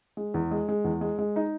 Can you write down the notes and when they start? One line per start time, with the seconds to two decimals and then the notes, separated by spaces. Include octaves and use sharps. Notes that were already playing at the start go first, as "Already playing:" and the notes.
0.17 G#3
0.34 E2
0.51 G#3
0.69 G#3
0.84 E2
1.01 G#3
1.19 G#3
1.36 D#4